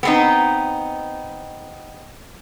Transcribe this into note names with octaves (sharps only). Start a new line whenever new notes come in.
B3 C4 D#4